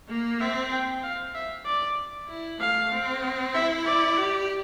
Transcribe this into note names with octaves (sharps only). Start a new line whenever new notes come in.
A#3
C4 E5
G5
F5
E5
D5
E4
A3 F5
C4
E4 E5
D5
G4